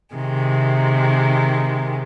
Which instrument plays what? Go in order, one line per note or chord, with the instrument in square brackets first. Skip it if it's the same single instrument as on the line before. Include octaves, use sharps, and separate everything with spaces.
[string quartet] C3 D#3 G#3